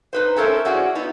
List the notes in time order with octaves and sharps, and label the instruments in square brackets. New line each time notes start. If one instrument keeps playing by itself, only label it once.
[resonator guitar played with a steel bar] D#4 B4 C5
C#4 A4 A#4 C5 E5
C#4 E4 F#4 G#4 D5
B3 D#4 E4